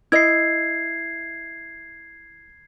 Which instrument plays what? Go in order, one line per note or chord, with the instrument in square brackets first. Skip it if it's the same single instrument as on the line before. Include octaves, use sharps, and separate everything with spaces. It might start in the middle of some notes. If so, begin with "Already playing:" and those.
[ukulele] E4 D#5 [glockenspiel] G#6 C7